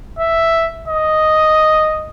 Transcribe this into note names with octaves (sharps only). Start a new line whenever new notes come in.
E5
D#5